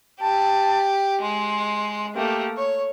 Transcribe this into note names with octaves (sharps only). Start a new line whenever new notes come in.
G4 A5
G#3 C6
A3 A#3 G4
C#5 C#6